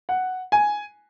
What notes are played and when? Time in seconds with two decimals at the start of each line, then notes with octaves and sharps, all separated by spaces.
0.09 F#5
0.52 G#5